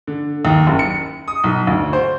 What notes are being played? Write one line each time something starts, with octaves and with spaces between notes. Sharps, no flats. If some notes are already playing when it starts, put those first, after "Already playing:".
D3
D#2
F#1
C#7
D#6
B1
D2
C5